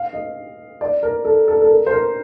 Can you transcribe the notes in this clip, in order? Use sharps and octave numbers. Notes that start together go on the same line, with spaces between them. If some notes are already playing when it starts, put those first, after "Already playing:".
Already playing: F5
D#5
D5
A#4
A4
A4
A4
A#4
C5
A#4